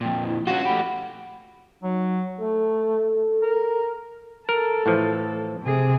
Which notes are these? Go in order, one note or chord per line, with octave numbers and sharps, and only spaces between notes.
F2 A#2 G5
E4
C#4 F4 F#4 F#5
A3 G4 B5
F#3 D#4
A3 A4
A#4
A4 A#4
A2 E3 F3
C3 G#4